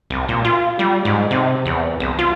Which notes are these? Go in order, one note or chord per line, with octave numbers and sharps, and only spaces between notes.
C2
A#2
F4
G3
G#2
C3
E2
C2
F4